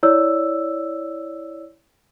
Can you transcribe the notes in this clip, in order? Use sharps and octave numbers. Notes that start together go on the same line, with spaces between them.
E4 C#5 D5 E6